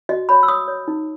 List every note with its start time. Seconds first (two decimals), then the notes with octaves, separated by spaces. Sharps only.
0.09 F#4 D#5
0.29 C#5 B5
0.43 E6
0.48 C#5 D#6
0.68 C#5
0.88 D#4